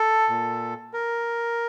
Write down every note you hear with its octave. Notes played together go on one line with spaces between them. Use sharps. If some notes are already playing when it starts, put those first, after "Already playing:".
Already playing: A4
A#2
A#4